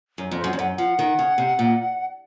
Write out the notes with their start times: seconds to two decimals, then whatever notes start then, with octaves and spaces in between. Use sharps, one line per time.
0.18 F#2
0.31 F2
0.39 C5
0.44 F#2
0.53 F2
0.58 F#2 F#5
0.76 F3 F#5
0.99 D#3
1.19 C#3
1.38 C3
1.59 A#2